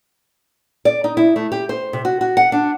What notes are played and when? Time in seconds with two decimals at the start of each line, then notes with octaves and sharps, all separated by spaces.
0.85 D5
1.04 D#4
1.17 E4
1.36 A3
1.52 G4
1.69 C5
1.93 C3
2.05 F#4
2.21 F#4
2.37 F#5
2.52 D4